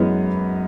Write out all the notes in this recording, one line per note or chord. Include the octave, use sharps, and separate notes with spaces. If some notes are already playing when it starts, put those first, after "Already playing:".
Already playing: F#2 E3 G#3 B3